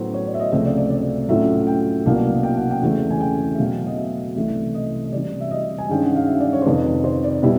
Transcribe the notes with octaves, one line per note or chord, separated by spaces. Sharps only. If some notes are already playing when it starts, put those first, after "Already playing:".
Already playing: A2 F#3 B3 C5
C#5
D5
E5
D#5
C#2 C3 F3 A3 C4 E5
D5
D5
D5
A2 F#3 A3 C#4 F4 E5
G5
C2 B2 F#3 A#3 F5
G5
F#5
G5
E2 C#3 E3 A3 C4
G#5
G5
E5
B2 F#3 A3 F5
D#5
E5
C2 C3 E3 A3 E5
D#5
D#5
C3 E3 G3 D5
E5
D#5
G#5
G2 D#3 G#3 C#4 G5
F#5
F5
E5
D5
C#5
C5
F2 C3 D#3 B4
C5
D5
B2 G3 B3 E4